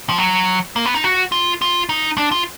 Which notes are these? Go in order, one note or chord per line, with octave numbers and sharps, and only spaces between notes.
F3
F#3
A#3
B3
D#4
F#4
F4
F4
D#4
D4
F4